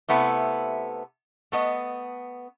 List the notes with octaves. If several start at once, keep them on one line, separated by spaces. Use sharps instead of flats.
C3 A3 B3 E4
A3 B3 D#5